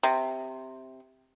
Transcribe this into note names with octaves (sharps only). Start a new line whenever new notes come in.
C3